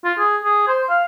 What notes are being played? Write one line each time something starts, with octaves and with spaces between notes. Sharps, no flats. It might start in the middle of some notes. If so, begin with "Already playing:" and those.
F4
G#4
G#4
C5
F5